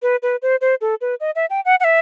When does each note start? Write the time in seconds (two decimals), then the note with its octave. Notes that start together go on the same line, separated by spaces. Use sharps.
0.02 B4
0.22 B4
0.42 C5
0.61 C5
0.81 A4
1.01 B4
1.20 D#5
1.36 E5
1.50 G5
1.65 F#5
1.80 F#5
1.84 E5